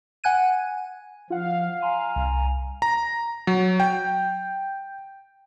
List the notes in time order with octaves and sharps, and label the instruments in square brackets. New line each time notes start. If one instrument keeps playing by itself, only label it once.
[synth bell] F#5 G#5 F#6 G#6 D#7
[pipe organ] F3 [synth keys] F4 F#5 [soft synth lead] F5
[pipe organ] G#5 A#5 [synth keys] C6
[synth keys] C2
[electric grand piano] A#5
F#3
G5